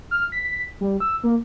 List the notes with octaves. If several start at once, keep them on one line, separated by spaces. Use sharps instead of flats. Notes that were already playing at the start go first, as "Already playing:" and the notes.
F6
B6
G3
E6
A#3